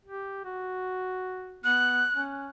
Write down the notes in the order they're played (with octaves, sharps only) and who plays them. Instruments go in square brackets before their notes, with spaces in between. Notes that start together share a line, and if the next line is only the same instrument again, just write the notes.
[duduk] G4
F#4
[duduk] B3 [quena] F#6
[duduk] C#4